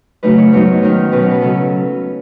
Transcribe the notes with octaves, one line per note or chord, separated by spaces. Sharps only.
F#2 C#3 F#3 A3 D#4 B4
C#5
G#2 F#3 B3 D#4 C#5
D#3 F#3 C#4
B2 F#3 C#4 B4
C#5
B4
C#3 F#3 C#4 A4